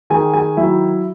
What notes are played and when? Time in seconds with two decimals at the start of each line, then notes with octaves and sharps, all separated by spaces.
0.10 D#3 G#4 G#5
0.34 G#4 G#5
0.57 F#3 E4 E5